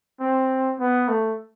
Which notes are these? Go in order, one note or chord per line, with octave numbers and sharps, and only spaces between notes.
C4
B3
A3